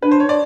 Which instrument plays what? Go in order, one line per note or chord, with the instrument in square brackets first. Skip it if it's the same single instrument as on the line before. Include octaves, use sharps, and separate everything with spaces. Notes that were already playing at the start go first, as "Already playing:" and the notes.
[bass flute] D4 [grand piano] B4
[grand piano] C5
C#5
D5